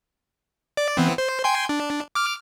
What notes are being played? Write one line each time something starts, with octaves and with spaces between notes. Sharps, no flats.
D5
E3 B3 C4
C5
G5 G#5 C6
D4
D6 F6